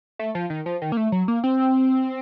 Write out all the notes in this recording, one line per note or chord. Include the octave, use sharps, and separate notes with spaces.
A3
F3
D#3
F3
D#3
A#3
A3
F#3
A#3
C4